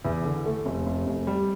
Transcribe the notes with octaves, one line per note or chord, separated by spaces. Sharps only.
E2 E4
D3
A3
F1
F1
F1
G3